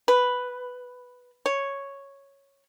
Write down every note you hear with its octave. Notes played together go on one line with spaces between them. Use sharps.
B4
C#5